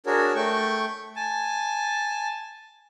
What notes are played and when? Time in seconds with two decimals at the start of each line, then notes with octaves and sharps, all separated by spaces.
0.06 D4 F#4 G#4 A#4 C#5
0.35 A3 G5 C#6
1.16 G#5 A5